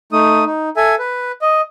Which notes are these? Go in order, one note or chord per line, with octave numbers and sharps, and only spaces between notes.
A3 D#4 D#6
D#4
A4 E5 G#5
B4
D#5